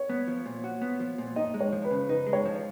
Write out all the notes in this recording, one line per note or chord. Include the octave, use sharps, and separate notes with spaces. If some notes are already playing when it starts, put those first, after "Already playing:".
Already playing: C#5
B3
F3
A#2
F#4
B3
F3
A#2
D#4 D#5
G#3
C#5
F3
B4
C#3
D#4 B4
G#3
C#5
F3